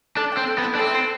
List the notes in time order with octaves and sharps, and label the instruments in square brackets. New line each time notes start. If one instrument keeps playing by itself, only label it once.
[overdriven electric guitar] D4 [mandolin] A4
[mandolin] G5
[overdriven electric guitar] C4
[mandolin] A4
[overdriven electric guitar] B3
[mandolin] E4
[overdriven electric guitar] D4
[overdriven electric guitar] C4 [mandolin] A4
[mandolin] C5